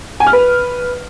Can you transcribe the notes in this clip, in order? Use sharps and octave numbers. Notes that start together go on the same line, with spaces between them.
G#5
F6
B4